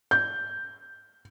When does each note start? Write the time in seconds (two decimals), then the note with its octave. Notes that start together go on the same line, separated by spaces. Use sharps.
0.11 G6